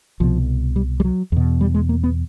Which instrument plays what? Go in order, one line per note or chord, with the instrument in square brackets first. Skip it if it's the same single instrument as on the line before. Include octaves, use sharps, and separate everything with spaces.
[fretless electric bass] C2 B2 F3
G3
G3
F#3
E2 B2
G3
G#3
A#3
B3